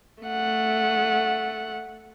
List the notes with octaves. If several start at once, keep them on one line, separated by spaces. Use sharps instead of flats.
A3 F#5